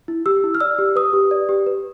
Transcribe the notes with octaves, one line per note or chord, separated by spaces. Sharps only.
E4
G4 E6
E4
F6
D5 E6
G4
B4 D#6
G4
D5
G4
B4